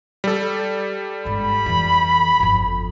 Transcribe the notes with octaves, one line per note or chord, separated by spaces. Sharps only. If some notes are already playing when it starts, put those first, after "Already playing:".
G3 A4
G1 G#2 B5
F2 E3
G1 F2